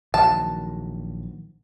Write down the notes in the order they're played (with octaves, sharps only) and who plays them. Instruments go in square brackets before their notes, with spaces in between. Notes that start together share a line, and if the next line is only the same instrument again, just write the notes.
[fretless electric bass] A#1 D#3 F#3 [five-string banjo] A5